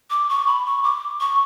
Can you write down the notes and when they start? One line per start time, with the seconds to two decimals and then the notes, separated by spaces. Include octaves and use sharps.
0.10 D6
0.29 C#6
0.47 B5
0.66 C#6
0.83 D6
1.20 C#6